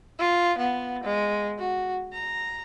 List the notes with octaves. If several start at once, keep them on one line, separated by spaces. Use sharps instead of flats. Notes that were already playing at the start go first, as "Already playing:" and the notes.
F4
B3
G#3
F#4
A#5